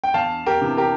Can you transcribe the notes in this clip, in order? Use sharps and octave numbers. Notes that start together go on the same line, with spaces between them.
G5
E2 F5 A5
G4 A#4
C3 E3
G4 A#4